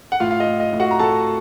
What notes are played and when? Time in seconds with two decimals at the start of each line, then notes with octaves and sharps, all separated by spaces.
0.12 F#5
0.20 A2 F4 F5
0.31 F5
0.40 D#5
0.47 A2
0.60 D#5
0.73 A2
0.80 F#4 F#5
0.91 A#5
0.99 A2 A4 A5